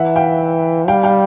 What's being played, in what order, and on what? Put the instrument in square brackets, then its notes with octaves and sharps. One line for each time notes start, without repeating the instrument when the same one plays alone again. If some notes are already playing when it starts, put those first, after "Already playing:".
Already playing: [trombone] E3 [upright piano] E5 F#5
[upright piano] F5 G5
[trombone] G3 [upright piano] F5 G5
[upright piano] F5 G5